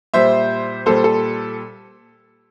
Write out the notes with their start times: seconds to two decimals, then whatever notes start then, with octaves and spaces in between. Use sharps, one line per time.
0.14 A#2 G3 C5 E5
0.86 A#2 G3 A4 C5
1.04 A4